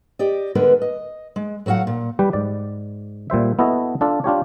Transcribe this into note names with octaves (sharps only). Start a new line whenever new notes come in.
G4 D5 D#5
D3 G#3 B3 A#4 B4
D#5
G#3
A2 F#3 F#4 F5 F#5
A#2
G3 G4 B4
G#2 D5
A#2 G3 C5 E5
B3 E4 F#4 A4 D#5
D4 F4 A4
D4 F4 G4 C#5